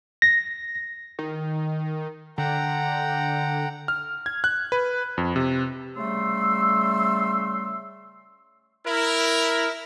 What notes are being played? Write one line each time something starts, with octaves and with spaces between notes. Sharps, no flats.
A#6
D#3
D3 F#5 G5 A#5
F6
G#6
F#6
B4
F2
C3
C#3 G3 A3 C6 E6
E4 A#4